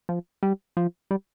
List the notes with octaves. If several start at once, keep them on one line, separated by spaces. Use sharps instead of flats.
F3
G3
F3
G3